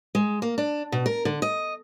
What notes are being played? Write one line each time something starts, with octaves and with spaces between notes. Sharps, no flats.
G#3
A#3
D4
B2
A#4
D3
D#5